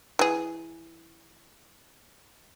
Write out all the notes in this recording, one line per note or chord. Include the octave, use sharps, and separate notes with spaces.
E3 G#4